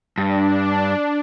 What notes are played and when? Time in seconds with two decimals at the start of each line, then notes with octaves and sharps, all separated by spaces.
0.18 G2 D4